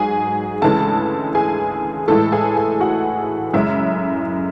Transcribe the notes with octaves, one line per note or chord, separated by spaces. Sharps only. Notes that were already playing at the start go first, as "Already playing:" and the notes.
Already playing: G#2 F#3 G#4 G#5
D2 C#3 E3 G#3 A4 A5
G#4 G#5
A2 E3 G#3 A4 A5
G#4 G#5
G#4 G#5
F#4 F#5
F#2 C#3 G#3 E4 E5